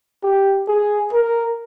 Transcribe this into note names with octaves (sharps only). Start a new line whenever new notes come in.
G4
G#4
A#4